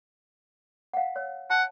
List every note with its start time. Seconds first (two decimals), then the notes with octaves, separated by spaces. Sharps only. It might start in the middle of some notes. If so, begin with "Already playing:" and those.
0.93 F5 F#5
1.16 C#5 E6
1.50 F#5 A5